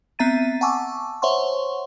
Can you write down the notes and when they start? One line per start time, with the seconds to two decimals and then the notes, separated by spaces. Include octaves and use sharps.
0.19 B3 C4 E5 A#5 A6 D#7
0.61 F#5 G#5 A5 C#6 D6 E6
1.22 C5 C#5 E5 F#5 C6 C#6